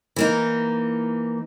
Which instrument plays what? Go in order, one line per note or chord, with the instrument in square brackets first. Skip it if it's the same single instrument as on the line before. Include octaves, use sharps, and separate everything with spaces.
[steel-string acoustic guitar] E3 A#3 D#4